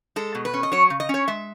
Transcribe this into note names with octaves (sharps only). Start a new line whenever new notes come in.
G#3 A4
B2
B4
C#4
D#5
F#3 C#5
C#3
D#5
C#4 C#5
G#3 E5